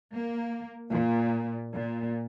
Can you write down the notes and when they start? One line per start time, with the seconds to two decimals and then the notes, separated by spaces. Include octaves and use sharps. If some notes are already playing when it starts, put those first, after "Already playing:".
0.14 A#3
0.90 A#2
1.74 A#2